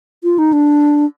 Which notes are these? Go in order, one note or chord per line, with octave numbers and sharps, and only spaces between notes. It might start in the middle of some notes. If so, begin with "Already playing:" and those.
F4
D#4
D4